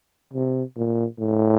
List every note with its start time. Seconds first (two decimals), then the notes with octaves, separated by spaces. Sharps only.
0.33 C3
0.76 A#2
1.18 A2